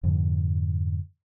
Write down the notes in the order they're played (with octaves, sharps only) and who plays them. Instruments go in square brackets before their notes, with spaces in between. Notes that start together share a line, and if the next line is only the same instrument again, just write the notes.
[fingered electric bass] F2 G#2 D3 F3